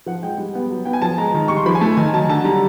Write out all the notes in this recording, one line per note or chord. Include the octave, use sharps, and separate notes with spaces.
F3 F#5
G#3 G5
G3
B3
F#3
B3 G5
G#5
F3 A5
G#3 A#5
D#3
G3 C#6
C6
F3 B5
G#5
A3 A5
D#3 G#5
F#3 A5
D3 A5
G3 A#5